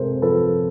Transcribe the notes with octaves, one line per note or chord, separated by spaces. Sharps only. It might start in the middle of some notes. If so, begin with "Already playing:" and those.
Already playing: C3 G#3 A4 A#4 C5
F3 A4 B4